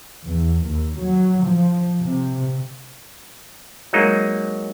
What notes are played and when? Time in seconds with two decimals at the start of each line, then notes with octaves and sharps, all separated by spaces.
0.23 E2
0.65 D#2
1.00 F#3
1.44 F3
2.01 C3
3.93 F#3 G#3 A#3 D#4